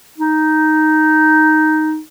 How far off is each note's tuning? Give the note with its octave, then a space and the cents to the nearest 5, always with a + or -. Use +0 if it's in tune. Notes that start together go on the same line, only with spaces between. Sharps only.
D#4 +0